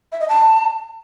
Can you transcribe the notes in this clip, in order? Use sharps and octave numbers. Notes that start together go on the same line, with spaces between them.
E5
D#5
A5